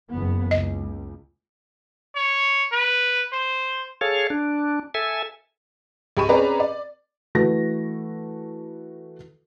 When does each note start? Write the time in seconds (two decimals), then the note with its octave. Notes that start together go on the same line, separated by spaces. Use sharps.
0.10 F#1 E2 B3
0.51 C#2 D#5
2.16 C#5
2.73 B4
3.33 C5
4.01 G#4 A4 C#5 F5
4.30 D4
4.94 A4 E5 G#5
6.17 C#2 G4 D#5 B5 C#6 D#7
6.29 C4 C#4 G#4 B4 D5 A#5
6.60 D5
7.35 E3 A3 F#4 A4 B4 A#6